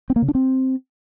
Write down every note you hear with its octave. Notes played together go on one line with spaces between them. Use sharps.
C4
A#3
C#3
D4
C4